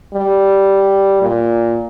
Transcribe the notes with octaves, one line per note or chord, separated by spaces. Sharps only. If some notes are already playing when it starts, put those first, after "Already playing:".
G3
A#2